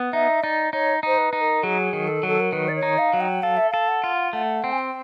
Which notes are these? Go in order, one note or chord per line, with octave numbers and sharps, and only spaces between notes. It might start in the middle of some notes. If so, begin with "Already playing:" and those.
Already playing: B3
D#4 E5
D#4 D5
D#4 C#5
D#4 C5
B4
D#4
A#4
F#3 G#4
D#3
A4
F#3 A4
A#4
D#3 B4
D5
C#5
D#4
F5
F#3
G5
A4 F5
E5
A4 F5
F#5
F4
A3 F#5
C4
G#5
G5